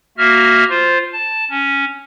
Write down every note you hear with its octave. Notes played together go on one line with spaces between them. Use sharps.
A#3 F#4 E5 F6
F4 C5
A5
C#4